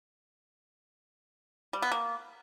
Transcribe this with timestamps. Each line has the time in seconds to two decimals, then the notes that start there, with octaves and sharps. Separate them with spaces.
1.73 G3
1.82 B3
1.92 A#3